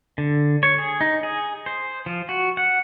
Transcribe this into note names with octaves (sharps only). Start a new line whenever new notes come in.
D3
C#5
G#4
D#4
G#4
C5
F3
F#4
F#5